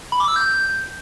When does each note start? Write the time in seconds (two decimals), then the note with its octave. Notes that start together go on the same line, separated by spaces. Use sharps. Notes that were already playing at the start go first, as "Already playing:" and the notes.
0.12 B5
0.20 D6
0.28 E6
0.36 G6